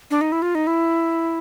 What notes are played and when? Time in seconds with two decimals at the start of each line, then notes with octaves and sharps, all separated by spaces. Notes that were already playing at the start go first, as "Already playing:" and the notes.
0.11 D4
0.21 D#4
0.32 E4
0.42 F4
0.55 D#4
0.67 E4